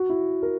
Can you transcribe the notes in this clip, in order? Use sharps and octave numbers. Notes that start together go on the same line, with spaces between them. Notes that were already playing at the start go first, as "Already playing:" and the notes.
Already playing: F#4
E4
A#4